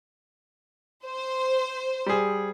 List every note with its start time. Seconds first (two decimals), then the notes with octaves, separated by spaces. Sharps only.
1.06 C5
2.06 G3 G#4